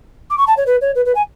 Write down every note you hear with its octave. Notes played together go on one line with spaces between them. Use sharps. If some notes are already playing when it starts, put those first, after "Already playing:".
D6
C#6
A5
C#5
B4
C#5
B4
B4
G#5